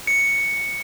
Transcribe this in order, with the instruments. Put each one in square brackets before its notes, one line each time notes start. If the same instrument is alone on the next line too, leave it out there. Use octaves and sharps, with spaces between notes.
[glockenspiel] C#7